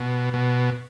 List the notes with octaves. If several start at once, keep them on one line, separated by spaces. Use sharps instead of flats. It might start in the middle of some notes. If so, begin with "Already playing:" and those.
Already playing: B2
B2